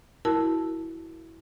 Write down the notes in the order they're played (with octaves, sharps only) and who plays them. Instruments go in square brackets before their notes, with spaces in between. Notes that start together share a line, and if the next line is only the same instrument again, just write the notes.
[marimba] E4 F#4 A#4 A5